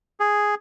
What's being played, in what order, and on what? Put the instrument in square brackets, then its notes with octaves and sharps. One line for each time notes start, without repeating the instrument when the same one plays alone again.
[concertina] G#4